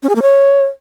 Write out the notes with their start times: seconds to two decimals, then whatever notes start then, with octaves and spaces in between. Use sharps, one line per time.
0.03 C#4
0.09 G#4
0.16 A#3
0.22 C#5